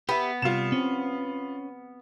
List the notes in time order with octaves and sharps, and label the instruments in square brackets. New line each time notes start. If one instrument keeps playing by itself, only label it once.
[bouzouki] B3 [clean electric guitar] G4 E5
[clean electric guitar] C3 G3 [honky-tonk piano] F4 E7
[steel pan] C4 [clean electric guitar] C#4